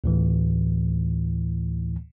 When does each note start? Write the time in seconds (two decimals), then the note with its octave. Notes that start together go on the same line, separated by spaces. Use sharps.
0.04 D2 A2 E3